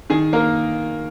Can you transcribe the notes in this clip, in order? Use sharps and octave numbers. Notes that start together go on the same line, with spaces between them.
D#3 G#4
A#3 A#4